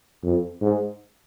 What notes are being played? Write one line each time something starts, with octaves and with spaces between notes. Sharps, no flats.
F2
G#2